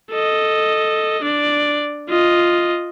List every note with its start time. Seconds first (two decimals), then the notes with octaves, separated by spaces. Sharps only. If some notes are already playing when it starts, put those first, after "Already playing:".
0.11 A4 D#5
1.23 D4 D5
2.09 F4 D#5